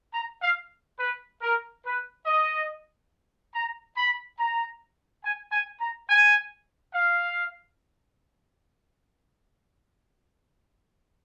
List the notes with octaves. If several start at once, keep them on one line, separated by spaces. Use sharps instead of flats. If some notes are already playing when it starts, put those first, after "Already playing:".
A#5
F5
B4
A#4
B4
D#5
A#5
B5
A#5
G#5
G#5
A#5
G#5
F5